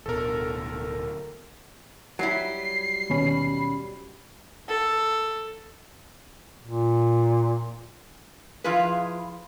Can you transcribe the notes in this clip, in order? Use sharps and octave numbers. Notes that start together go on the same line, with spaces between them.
D1 B2 A4 A#4
F#3 G3 E4 C7
D#2 B2 C#4 B5
A4
A#2
F3 E4 F4 G#4 B4